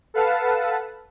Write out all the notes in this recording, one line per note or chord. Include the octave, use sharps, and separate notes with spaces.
A4 B4 F5 F#5 A5